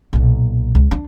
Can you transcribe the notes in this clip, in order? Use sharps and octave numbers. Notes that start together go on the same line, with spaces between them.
B1 A#2
C#2
D4